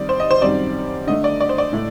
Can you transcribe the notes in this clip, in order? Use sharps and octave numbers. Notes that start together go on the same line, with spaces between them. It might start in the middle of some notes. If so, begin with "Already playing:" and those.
Already playing: D#3 G3 C4 D#4 D5
C5
D#5
C5
F#2 D#3 G3 C4 D5
D3 A3 D4 D#5
D5
D5
C5
D5
A2 A3